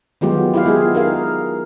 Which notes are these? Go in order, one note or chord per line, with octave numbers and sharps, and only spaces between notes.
D#3 F#3 G#3 B3 F4 G4
E4 G4 F5
G#3 B3 F4 G#4
D#4 A#4 F5